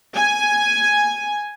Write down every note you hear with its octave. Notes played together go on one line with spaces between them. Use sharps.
G#5